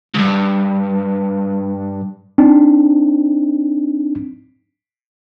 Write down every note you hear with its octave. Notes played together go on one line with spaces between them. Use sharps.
C#2 G2
C4 D4 D#4